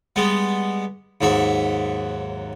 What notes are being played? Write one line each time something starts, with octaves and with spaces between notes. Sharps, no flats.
G3 G#3 B3
D#2 G#2 F#3 E5